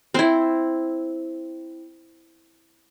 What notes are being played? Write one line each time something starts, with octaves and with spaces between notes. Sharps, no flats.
C4 E4